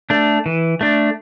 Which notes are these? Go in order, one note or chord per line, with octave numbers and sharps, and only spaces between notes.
A3 D4
E3
A3 D4